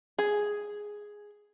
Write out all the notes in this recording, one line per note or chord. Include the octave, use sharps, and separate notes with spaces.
G#4